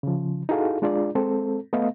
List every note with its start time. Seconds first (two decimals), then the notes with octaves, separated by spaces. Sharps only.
0.03 C#3 F3
0.49 D#4 E4 F#4 G#4 A4 F5
0.82 G#3 D4 F4 G#4 D5
1.15 G#3 C4 A4
1.73 A3 B3 D#5 F5